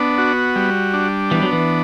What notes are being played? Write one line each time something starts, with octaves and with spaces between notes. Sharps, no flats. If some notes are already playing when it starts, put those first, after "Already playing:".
Already playing: B3 D4
F#4
G3
D4
E3 B3
F#3
E3